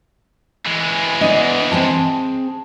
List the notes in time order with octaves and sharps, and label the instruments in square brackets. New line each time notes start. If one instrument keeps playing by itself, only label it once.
[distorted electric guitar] E3 G#3
[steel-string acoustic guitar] B3 D4 D#5
C4 G#4 A5